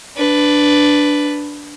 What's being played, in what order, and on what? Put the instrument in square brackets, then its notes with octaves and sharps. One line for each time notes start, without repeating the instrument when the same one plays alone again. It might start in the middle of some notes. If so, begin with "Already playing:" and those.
[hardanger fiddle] D4 B4